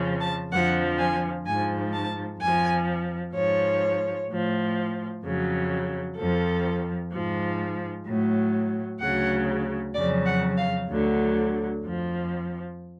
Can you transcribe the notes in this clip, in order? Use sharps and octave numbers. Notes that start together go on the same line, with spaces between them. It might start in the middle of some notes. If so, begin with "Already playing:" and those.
Already playing: F2 C#3 F3
A5
F2 D3 F3 F#5
G#5
G#2 F3 G#5
A5
F2 F3 G#5
G#2 F3 C#5
A2 F3
F2 C#3 F#3
F2 F3 A4
G#2 F3
A2 F#3
D2 C#3 F#3 F#5
F2 C#3 F#3 D5
F#5
F5
D2 D3 F#3
F2 F3